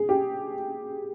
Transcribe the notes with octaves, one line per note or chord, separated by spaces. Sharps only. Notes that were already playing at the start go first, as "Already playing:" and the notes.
Already playing: G#4
G4